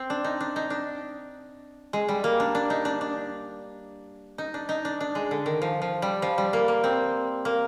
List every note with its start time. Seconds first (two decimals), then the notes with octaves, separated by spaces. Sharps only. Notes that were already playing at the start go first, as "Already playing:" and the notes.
Already playing: C4
0.10 D4
0.24 D#4
0.41 D4
0.56 D#4
0.70 D4
1.93 G#3
2.08 G3
2.24 A#3
2.40 D4
2.55 D4
2.70 D#4
2.85 D4
3.01 D4
4.38 D#4
4.54 D4
4.69 D#4
4.85 D4
5.01 D4
5.15 G#3
5.31 D3
5.46 D#3
5.62 F3
5.82 F3
6.02 G3
6.22 F3
6.38 G3
6.53 A#3
6.68 A#3
6.84 C4
7.45 A#3